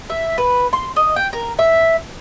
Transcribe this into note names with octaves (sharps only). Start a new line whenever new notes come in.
E5
B4
C6
D#5
G5
A#4
E5